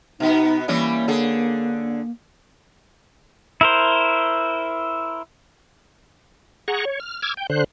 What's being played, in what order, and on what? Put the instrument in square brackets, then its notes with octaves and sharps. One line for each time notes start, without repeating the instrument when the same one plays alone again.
[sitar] B2 B3 [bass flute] D#4
[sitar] E3 G3 C#4 [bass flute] A#3
[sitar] D3 G#4
[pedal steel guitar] E4 A#4 C5
[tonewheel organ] G#4 F#5 A#5 C#6
C#5
F6
D6 E6 F6 G#6
G5
D3 C5 F#6